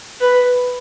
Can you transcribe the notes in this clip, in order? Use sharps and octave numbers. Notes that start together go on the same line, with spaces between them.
B4